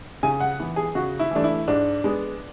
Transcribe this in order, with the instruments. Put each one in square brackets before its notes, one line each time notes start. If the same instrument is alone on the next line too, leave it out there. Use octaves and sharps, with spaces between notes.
[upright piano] C#3 G#5
F#5
E3 B3
G#4
C#3 F#4
E4
E3 A3 D4
E4
G#2 D4
G#3 B3